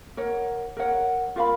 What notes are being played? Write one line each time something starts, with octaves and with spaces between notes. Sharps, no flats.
A#4 C#5 F#5
A#4 C#5 F#5
F4 A#4 F5 B5